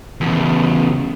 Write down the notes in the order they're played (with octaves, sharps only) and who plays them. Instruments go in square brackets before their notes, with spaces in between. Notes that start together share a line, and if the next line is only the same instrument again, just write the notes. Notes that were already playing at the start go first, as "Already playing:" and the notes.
[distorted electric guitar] E2 C#3